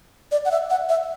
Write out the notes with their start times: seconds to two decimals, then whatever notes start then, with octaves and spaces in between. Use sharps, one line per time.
0.32 D5
0.45 F#5
0.51 E5
0.70 F#5
0.89 E5